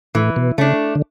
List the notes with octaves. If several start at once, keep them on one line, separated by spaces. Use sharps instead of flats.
A2 E3
B2
C#3 A3 D4
D3